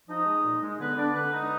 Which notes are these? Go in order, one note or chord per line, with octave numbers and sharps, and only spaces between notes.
F3 D#4 D#5
G#3
A#2
G#3
D3 B3 B4
D3 D4 D5
D3 B3 B4
G#3 D#4